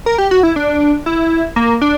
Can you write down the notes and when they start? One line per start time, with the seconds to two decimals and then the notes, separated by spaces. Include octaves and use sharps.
0.06 A#4
0.18 G4
0.31 F#4
0.43 E4
0.56 D4
1.06 E4
1.56 A#3
1.81 D4